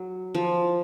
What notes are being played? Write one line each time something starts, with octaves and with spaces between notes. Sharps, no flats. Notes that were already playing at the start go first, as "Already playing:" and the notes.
Already playing: F#3
F3